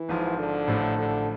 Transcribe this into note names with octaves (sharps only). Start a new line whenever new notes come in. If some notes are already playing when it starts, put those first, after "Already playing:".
Already playing: E3
G#1 G#2 F3
D3
A1 A2 F3 A3 D4
D3